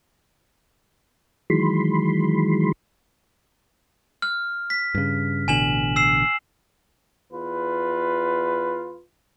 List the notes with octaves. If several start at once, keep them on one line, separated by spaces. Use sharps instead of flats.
D#3 E3 F#3 G#3 B5 C6
F6
B6
G2 C#3
A1 B2 D3 G#5 E7 F#7
E6 C7 E7
E2 F4 B4